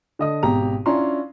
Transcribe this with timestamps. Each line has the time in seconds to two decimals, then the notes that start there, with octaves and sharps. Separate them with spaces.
0.19 D3 D#5 D#6
0.43 G#1 B2 G4 A#5
0.86 C#4 D4 E4 F4 A#5 C6